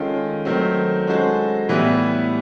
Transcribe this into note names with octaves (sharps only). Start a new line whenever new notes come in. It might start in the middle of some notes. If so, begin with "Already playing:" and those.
Already playing: D#3 G#3 C#4 F4 A4
D#3 F#3 A3 C4
G#3 C#4 F#4 A4 C5
A2 E3 G3 B3 E4